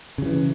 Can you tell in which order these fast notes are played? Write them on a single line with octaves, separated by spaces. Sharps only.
C#3 F#3 E3